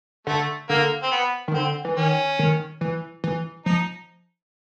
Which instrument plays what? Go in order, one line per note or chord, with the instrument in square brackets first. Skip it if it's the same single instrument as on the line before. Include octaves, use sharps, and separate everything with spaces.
[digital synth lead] D3 [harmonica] A3
[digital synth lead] D3 [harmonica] A#3
[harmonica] C4
B3
[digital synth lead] D#3
[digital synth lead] D3 [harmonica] C4
[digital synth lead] E3
[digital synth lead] D#3 [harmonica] C#4
[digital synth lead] D#3
E3
E3
[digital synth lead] F3 [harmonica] D#4